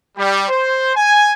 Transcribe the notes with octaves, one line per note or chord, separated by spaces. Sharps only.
G3
C5
G#5